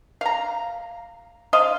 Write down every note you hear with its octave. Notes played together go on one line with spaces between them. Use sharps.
F5 A#5
C5 D#5 F5